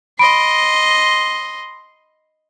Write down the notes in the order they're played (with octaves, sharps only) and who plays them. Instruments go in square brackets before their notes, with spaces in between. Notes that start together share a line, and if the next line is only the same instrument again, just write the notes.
[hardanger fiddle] D#5 C6 [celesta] B5 D7